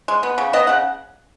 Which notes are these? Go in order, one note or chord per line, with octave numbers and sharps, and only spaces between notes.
G#3
B3
C#3
B3 D#5
C#3 F#5